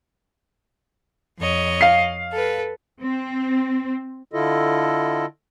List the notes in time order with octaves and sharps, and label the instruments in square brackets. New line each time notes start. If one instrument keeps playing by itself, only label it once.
[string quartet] F2 C#5 D#5
[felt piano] F5 C7
[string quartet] A4 B4
[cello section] C4
[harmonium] D3 E4 F4 A4 D#5